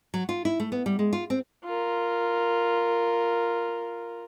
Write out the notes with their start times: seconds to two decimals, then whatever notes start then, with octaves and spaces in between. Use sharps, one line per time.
0.14 F#3
0.29 F4
0.45 E4
0.60 A3
0.72 B3
0.86 G3
0.99 G#3
1.13 F4
1.30 C4
1.64 F4 A#4